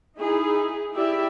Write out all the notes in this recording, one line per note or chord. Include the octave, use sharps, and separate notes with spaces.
D#4 E4 G#4
E4 G4 D5 E5